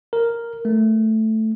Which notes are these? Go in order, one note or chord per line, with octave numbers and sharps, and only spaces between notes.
A#4
A3